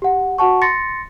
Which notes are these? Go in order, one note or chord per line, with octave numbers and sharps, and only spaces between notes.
G4 F#5
F#4 F#5 A5 C#6
C6 A6 A#6 C#7